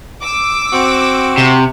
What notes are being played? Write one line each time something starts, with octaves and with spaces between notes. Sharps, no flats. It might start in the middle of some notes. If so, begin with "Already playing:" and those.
D6 E6
C4 F#4
C3